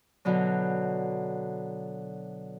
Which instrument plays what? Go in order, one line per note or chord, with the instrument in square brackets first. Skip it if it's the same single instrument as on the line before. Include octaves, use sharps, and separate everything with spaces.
[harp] B2 D3 F#3